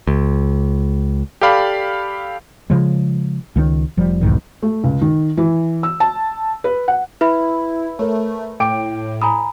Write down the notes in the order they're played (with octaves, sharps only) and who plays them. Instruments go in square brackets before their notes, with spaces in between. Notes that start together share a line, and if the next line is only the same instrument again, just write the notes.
[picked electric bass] C#2
[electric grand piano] G4 A4 D5 F5 B5
[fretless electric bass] C#3 F3 G#3
C#2 D#3 C#4
F1 F3 G3
B1 E2 G#2 D#3
[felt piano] A3
C#2
D#3
E3
E6
A5
B4
F#5
[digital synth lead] E4 [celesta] B4 E5 B5
[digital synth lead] A3 [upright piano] A#4 C#5
[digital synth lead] A2 [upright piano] G5 D6 D7
[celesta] G#5 A#5 B5 [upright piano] D#6